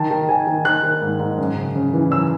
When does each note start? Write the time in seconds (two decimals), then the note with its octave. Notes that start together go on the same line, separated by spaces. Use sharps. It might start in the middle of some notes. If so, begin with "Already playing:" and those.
Already playing: D#3 A5
0.10 D#3
0.29 D#3 G#5
0.47 D#3
0.65 D#3 F#6
0.83 D#3
1.02 G#2
1.20 G#2
1.38 F#2
1.56 C#3
1.75 C#3
1.93 E3
2.11 F#2 E6